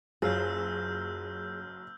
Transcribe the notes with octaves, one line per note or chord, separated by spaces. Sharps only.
F#1 F#2 F#3 F4 G#4 E6 F6 G6